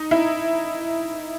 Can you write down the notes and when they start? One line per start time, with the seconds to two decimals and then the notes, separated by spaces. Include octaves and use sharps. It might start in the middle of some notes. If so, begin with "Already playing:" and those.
Already playing: D#4
0.11 E4